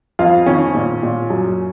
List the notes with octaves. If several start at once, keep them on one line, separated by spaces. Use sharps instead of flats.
F2 F4
D#3 C#4
A#2
A#2
F#2